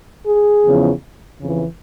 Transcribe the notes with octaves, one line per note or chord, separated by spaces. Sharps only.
G#4
E2 C#3 F3
F2 C#3 E3